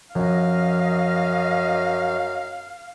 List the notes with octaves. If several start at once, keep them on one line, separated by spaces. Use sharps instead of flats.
F#2 F3 C#4 D#5 F5